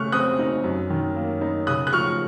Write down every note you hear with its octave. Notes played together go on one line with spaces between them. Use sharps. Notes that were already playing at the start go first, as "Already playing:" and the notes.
Already playing: C#3 A3 C#6 F6 F#6
C4 D#6 F#6
D#4
F#2
D#3
A#3
D#4
C#3 D#6 F#6
F#6
F3 C#6 F6